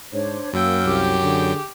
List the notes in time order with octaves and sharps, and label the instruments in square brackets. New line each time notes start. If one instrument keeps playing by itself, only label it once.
[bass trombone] G#2 [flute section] D4 C5 C#5
[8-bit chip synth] F#2 F#3 G5 [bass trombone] A#3 [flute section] F5 E6 F6
[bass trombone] C2 [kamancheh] G4
[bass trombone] D3 [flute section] G#4